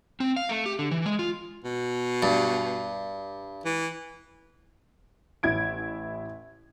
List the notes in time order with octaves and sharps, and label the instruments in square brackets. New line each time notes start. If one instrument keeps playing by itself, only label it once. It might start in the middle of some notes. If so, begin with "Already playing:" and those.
[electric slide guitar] C4
F5
A3
G4
D3
E3
G#3
F4
[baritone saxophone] B2
[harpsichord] G2
[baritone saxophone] E3
[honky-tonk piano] A1 E4 G#6 D7